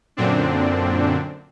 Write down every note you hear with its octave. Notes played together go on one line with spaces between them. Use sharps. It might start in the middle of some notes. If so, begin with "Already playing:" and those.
F#2 A#2 D3 C4 D4